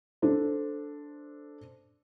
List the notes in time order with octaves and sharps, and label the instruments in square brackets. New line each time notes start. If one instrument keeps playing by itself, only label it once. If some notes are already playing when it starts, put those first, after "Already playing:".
[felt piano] D4 A4 C5